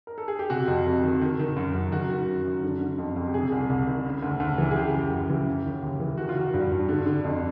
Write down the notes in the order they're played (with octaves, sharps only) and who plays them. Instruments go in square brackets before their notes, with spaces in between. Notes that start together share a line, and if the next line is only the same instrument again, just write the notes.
[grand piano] A#4
A4
G#4
G4
C3 F#4
F2
F2
D#3
D#3
D#3
F#2
F#2
D#3 F#4
D#3
F#2
F#2
D3
D3
F2
F2
G4
C3 G#4
C2
C2
D#3
C#3
D2
D2
E3
G#4
C#3 G4
F#2
F#2
E3
C#3
D#2
D#2
E3
D#3 F#4
F4
D#3 F#4
G2
G2
D3
D3
F2